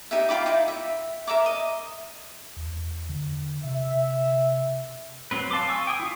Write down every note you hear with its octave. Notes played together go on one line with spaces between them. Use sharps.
D#4 G4 E5
F4 G5 B5 D6
D#4 E4
E5
A#4 E5 A#5 D6
D#5
E2
D3
C3 E5
F#3 C4 B4
F5 A5 C6 D6
G#5 C#6 E6
G5 G#5 D#6
E4 F4 C#6